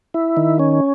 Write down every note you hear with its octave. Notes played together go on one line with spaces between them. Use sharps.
E4
D#3
C#4